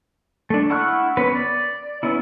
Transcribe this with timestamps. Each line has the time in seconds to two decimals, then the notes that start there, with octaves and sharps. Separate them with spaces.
0.50 A3 D4
0.70 E4 F#5 C#6 F6 F#6
1.17 B3 C#4 B4
1.35 D5
2.03 B3 C#4 E4